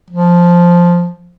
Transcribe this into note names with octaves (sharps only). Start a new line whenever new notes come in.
F3